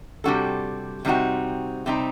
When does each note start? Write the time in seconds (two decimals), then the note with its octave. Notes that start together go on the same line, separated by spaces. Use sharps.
0.24 C3 G3 D4 F#4 A4
1.05 C3 G3 C4 D#4 F#4
1.86 C3 G3 C4 D#4